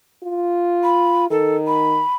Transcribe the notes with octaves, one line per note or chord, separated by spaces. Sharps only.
F4
B5
D#3 A4
B5